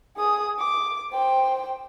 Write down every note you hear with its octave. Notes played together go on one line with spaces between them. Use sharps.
G#4 D#6
D6
C5 G5